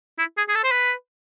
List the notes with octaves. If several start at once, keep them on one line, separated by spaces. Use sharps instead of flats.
E4
G#4
G#4
A4
C5
B4